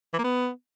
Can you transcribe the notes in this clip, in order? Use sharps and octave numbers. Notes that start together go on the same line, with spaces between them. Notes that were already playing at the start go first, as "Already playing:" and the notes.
E3
A#3
B3